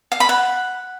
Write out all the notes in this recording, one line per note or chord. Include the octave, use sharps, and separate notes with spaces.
F5
B5
F#5